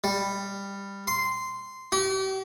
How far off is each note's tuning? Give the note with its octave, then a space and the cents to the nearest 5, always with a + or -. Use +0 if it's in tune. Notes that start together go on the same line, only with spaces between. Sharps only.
G3 +15
C6 -10
G4 -40